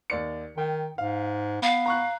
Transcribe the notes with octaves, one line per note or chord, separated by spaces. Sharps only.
D#2 D5 C#7
D#3 G5
G#2 F5
B3 F5
A#5 C#6 F#6